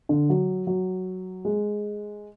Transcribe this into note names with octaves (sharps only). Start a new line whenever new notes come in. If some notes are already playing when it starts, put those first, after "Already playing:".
D3
F#3
F#3
G#3